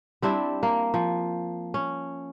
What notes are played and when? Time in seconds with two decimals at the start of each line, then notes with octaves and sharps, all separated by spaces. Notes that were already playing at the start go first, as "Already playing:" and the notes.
0.22 G3 C4 D4 E4
0.63 A#3
0.94 F3
1.74 C#4